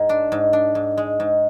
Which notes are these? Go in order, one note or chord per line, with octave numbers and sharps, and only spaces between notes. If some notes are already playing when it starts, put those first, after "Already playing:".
Already playing: G#2
D4
G#2
D4
G#2
G#3
G#2